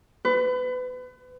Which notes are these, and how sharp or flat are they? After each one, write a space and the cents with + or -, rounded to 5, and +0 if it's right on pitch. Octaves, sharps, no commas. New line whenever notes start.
B4 +30